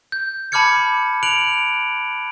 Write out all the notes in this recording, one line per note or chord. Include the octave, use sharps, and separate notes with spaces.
G6
A5 B5 D6 F6 G#6 C#7
F#6 D7 F7 F#7